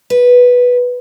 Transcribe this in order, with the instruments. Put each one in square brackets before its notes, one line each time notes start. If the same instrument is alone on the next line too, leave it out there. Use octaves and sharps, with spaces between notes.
[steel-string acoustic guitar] B4